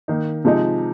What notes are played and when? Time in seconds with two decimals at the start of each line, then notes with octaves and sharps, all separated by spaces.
0.08 D#3 A#3 D#4
0.45 C3 F3 G#3 D#4